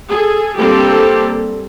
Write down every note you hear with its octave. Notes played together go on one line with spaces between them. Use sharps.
G#4 A4
G3 A#3 C4 D4 G4 A4